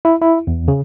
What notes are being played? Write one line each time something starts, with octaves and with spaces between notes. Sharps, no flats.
E4
E4
E2
C#3